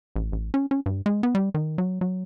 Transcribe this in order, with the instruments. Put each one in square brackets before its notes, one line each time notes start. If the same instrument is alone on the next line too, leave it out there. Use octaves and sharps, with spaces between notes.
[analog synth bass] A1
A1
C#4
C#4
G2
G#3
B3
G3
D#3
F#3
F#3